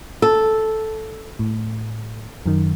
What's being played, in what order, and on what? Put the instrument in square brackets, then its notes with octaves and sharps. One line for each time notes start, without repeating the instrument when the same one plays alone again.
[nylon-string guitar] A4
[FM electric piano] A2
F#2 D#3